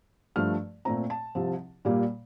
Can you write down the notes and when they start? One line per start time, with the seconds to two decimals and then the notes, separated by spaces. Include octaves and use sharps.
0.36 G2 F3 A3 F6
0.85 A#2 A3 C4 A#5
1.10 A5
1.35 C2 C3 F3 C4
1.85 A#2 G3 A#3